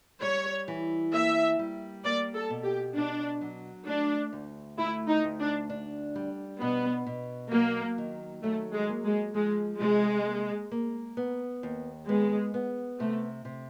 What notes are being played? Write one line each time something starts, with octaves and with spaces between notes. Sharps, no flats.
G3 C#5
E3
A#3 E5
G3
A#3 D5
A4
B2
G4
B2 D4
F#3
A3 D4
D2
A3 E4
D#4
D2
D4
D4
G3
B2 B3
B2
F#3 A#3
D#3
F#3 A3
G#3
A#3
G#3
F3 G#3
C3 G#3
A#3
A#3
B3
D#2
G#3 B3
B3
C3 A3
C3